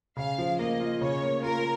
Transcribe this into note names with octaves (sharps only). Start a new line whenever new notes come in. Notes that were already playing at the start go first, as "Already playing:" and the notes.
C#3 F5
F3
A#3 D#5
F4
C#3 C#5
A#3
F4 A#4